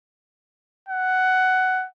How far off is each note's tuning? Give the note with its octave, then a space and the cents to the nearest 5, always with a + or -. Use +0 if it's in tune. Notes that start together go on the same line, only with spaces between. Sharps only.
F#5 +10